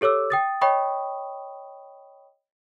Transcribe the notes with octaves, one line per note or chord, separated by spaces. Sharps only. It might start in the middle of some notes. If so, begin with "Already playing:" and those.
G4 A4 C#5 D6 E6
G5 D#6 A6
C#5 D#5 G5 B5 C#6 D#6